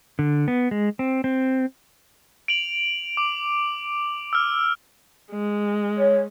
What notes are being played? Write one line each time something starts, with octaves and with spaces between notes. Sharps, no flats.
D3
B3
G#3
C4
C4
D7 F7 F#7
D6
E6 F6
G#3
C#5